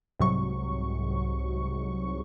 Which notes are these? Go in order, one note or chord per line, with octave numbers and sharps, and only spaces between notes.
C2 G#2 C3 F#3 C#6